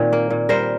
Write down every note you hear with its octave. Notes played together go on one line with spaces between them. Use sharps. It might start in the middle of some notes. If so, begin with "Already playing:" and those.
Already playing: A#2 D#3 C4
A#3
A#2
G3 A#4 C5